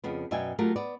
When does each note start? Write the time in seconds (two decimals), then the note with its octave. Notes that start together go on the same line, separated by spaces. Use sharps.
0.04 F2 C#3 B3
0.31 F#2 B2 D5 E5 G5 G#5
0.58 F#3 A3 F4 G4 A#4
0.76 B3 D5